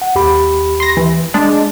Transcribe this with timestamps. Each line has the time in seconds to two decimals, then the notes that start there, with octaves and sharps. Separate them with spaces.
0.02 F#5
0.15 D#2 G4 B5
0.80 C6 A#6
0.97 E3
1.34 G#3 D4